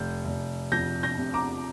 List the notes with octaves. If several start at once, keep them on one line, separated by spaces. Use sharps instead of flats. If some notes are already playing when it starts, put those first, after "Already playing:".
Already playing: F1 G6
F1
F2 G6 A#6
G6 A#6
C3
A#5 D6